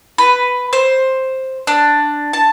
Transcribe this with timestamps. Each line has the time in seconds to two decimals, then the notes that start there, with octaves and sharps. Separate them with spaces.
0.18 B4
0.73 C5
1.67 D4
2.33 A5